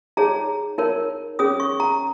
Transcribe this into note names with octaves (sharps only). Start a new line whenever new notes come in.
D#4 G#4 C#5 A#5
D#4 A#4 C#5
C#4 G#4 C#5 D#6
C#6
A#5